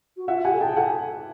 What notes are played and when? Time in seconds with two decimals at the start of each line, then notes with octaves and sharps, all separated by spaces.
0.17 F#4
0.28 F4 E5 F#5
0.44 G4 F#5 G#5
0.53 A4
0.61 G#4 G5 A5
0.77 A4 F#5 G#5